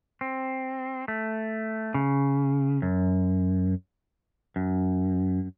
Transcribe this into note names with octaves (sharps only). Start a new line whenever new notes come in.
C4
A3
C#3
F#2
F#2